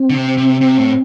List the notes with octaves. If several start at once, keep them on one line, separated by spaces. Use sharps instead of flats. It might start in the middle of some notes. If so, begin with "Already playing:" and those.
Already playing: C4
D3
C3
C3
C3
A2